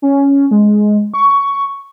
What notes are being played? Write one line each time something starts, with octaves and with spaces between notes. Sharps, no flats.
C#4
G#3
C#6